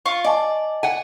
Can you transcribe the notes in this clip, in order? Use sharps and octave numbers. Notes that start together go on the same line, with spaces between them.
F4 C#6
D5 D#5 G#5 A5
F#5 G#5